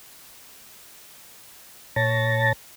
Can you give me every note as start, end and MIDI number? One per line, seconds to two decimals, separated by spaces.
1.96 2.53 46
1.96 2.53 73
1.96 2.53 81
1.96 2.53 93
1.96 2.53 94